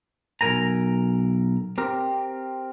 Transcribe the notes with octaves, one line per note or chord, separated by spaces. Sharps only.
B1 B2 A#4 G#5 A#5
C4 G4 A#4